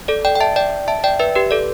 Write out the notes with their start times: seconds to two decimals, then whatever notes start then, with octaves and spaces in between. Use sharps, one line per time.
0.08 A4 D5
0.25 D5 G5
0.35 G5
0.40 E5 A5
0.56 D5 G5
0.88 E5 A5
1.04 D5 G5
1.20 B4 E5
1.36 G4 B4
1.51 A4 D5